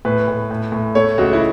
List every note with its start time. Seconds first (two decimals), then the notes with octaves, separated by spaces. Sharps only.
0.05 A2 B4
0.28 A2
0.51 A2
0.72 A2
0.95 A3 C#5
1.18 C#2 F#4
1.33 E4